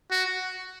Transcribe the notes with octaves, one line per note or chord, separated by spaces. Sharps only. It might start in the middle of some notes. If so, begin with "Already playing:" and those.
F#4